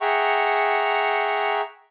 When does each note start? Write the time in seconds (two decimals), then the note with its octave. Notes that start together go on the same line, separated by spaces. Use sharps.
0.01 G#4 E5 F#5 G5 A#5 C#6